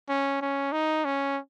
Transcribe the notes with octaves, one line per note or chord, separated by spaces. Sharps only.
C#4
C#4
D#4
C#4